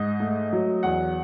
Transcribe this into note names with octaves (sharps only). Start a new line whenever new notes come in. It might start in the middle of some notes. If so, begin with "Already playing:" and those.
Already playing: G#2 D#5
A3
F#3
E2 F#5